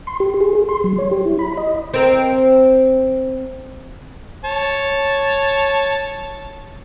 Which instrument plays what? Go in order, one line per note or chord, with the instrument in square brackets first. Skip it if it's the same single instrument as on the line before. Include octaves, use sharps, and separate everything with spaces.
[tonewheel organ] C6
G4
G#4
G#4
C6
F#3
C#5
G4
E4
B5
D#5
[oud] C4 A#4
[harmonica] C#5 A5